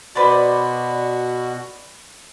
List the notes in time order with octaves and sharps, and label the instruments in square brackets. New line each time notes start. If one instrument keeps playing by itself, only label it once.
[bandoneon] B2 F#4 [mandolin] B4 C5 D5